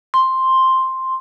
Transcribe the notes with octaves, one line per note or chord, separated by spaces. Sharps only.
C6